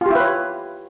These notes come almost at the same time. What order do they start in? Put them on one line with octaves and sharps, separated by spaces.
F4 G4 E4 B4 C#5